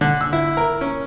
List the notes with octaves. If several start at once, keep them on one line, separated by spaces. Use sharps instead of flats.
D3
E6
E4
A#4
C#4